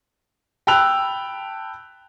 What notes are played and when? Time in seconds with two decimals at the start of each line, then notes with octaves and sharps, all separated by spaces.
0.67 G5 A5 B5 E6 F#6 F7